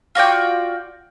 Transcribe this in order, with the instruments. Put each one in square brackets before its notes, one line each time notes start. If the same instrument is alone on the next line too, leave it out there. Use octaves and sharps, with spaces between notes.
[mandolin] F4 F#4 D5 G5